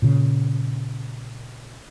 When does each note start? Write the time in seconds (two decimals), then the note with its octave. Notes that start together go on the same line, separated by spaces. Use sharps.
0.02 A#2 C#3